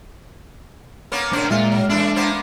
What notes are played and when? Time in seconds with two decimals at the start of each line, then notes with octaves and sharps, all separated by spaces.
1.12 A#3 B3 C#4
1.33 C#4 D4 A#4 C5
1.51 A#2 G#3 A#3 F4 E5 F6
1.72 F#3
1.90 E3 A3 D4 E4
2.16 A#3 B3 C5